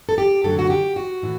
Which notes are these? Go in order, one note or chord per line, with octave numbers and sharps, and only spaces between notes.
A4
G4
F#2 D3 F#3 A3 A4
F#4
G4
F#4
A2 E3